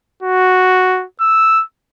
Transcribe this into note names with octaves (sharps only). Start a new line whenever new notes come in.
F#4
E6